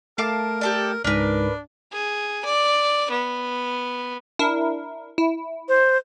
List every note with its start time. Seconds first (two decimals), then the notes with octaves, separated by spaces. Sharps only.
0.18 A3 A#4 F5 A5 D6
0.61 G4 A4 D5
1.04 C#2 G#2 D4 A#4 B4
1.92 G#4
2.45 D5
3.11 B3
4.39 D4 E4 A#4
5.18 E4
5.69 C5